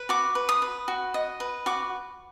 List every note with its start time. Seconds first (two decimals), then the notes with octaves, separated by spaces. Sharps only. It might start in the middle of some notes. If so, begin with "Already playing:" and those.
Already playing: B4
0.09 F#4 D6
0.35 B4
0.49 D#6
0.62 B4
0.88 F#4
1.14 D#5
1.40 B4
1.66 F#4 D6